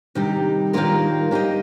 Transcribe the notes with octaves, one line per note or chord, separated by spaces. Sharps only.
C3 D#3 G3 D#4 G4
D#3 G3 A#3 F4 A#4
A#3 G4 C5 D#5